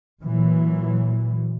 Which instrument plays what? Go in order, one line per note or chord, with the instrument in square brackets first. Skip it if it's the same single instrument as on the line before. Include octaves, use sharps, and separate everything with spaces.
[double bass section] A#2 E3 F#3